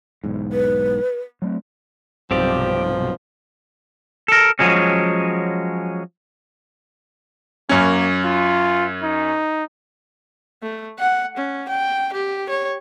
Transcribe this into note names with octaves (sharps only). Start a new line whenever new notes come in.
B1 E2 G#2
B4
F#3 A3 C4
B1 G2 C3 F3 C4 G4 D5
A4 A#4
F3 F#3 G#3 C#4
F#2 A#3 C#4
F4
D#4
A3
F#5
C#4
G5
G4
C#5